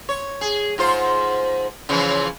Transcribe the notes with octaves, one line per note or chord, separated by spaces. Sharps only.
C#5
G#4
G#2 F4 C5
C#3 E3 F3